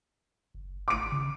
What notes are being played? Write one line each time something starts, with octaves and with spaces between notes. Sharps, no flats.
F#1
A1 D6 D7
C#3